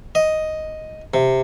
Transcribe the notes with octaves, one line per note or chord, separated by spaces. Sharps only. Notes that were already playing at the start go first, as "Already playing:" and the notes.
D#5
C3